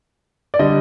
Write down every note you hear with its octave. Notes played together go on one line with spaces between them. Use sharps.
D5
D3 G3 D#5